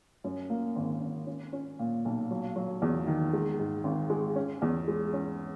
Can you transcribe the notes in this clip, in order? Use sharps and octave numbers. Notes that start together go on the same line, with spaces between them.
F#2
A#3
G#1
G#1
C#4
C#4
A#2
B1
F#3
F#3
E2
D#3
G#3
G#2
G#1
G#3
C#4
E2
G#3
C#4